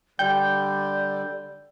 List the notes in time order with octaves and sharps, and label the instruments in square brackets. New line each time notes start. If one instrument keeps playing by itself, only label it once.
[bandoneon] D3 G3 [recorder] D5 [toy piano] G5 [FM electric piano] G6